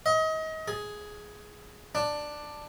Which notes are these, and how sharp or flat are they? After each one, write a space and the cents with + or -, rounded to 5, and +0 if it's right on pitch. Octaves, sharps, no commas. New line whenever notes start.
D#5 +30
G#4 +5
D4 +10